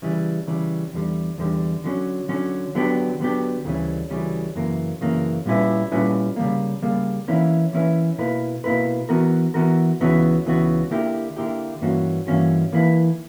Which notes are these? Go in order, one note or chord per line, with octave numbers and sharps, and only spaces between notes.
C#3 E3 G3
C#3 E3 G3
E2 D3 G3
E2 D3 G3
D3 F#3 C#4
D3 F#3 C#4
D3 F#3 B3 D4 G4
D3 F#3 B3 D4 G4
D2 C#3 E3 G3 C#4
D2 C#3 E3 G3 C#4
F#2 C#3 E3 A#3
F#2 C#3 E3 A#3
A#2 G3 C#4 E4 B4
A#2 G3 C#4 E4 B4
C#3 G3 A#3
C#3 G3 A#3
E3 A#3 C#4 E4 B4
E3 A#3 C#4 E4 B4
B2 A#3 E4 B4
B2 A#3 E4 B4
E3 B3 F#4 A#4
E3 B3 F#4 A#4
C#2 C#3 E3 B3 F#4
C#2 C#3 E3 B3 F#4
D3 A#3 E4 G4
D3 A#3 E4 G4
G2 E3 A#3 C#4 F#4
G2 E3 A#3 C#4 F#4
E3 A#3 E4 B4